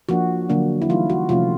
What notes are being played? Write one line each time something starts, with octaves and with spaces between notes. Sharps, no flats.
F3 A#3 D4 F#4
D3 F#3 A#3 D4
E4
E3 G3 A#3 D#4 F4
F#4
C3 F3 A3 C#4 F4